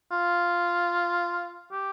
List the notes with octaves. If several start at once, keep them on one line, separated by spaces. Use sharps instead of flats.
F4
G4